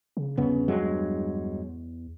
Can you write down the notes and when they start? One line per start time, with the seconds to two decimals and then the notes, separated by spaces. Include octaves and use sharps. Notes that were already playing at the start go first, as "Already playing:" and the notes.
0.17 C#3
0.37 G1 E2 C#3 B3
0.68 G2 F#3 G#3